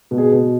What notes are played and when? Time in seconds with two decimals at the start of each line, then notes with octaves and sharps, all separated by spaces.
0.11 B2
0.18 G#4
0.32 B2